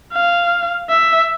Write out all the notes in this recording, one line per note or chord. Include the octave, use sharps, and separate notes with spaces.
F5
E5